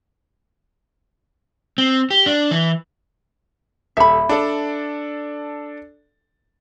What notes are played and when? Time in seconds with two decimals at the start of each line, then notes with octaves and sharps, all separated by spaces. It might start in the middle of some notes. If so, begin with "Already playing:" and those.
1.78 C4
2.11 G4
2.26 D4
2.51 E3
3.97 D#1 A4 E5 B5
4.29 D4 A4 D5